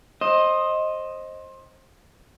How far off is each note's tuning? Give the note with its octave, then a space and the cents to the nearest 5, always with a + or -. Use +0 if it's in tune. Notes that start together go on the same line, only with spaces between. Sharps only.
C5 +20 D#5 +0